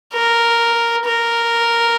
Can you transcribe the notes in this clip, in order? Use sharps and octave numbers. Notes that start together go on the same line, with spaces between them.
A#4
A#4